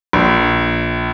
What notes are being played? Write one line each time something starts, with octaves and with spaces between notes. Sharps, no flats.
A#1